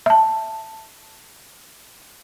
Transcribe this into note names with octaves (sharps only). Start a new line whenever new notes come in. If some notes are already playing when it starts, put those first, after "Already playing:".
E5 A5